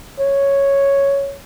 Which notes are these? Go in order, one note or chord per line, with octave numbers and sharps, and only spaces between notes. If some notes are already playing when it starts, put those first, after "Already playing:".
C#5